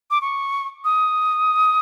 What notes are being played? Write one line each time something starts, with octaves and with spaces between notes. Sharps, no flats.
D6
C#6
D#6